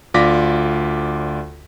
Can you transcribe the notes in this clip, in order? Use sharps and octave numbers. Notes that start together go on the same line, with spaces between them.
D2 F4 D5 D6 A#6 B6